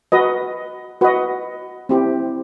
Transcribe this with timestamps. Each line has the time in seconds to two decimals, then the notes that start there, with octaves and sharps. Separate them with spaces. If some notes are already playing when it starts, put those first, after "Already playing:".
0.12 F#4 B4 D#5
1.01 F#4 B4 D#5
1.89 C4 E4 G4